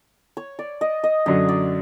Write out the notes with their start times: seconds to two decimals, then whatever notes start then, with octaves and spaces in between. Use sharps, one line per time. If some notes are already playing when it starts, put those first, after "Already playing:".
0.37 C#5
0.59 D5
0.81 D#5
1.04 D#5
1.26 F#2 D3 F#3 D#5
1.49 D5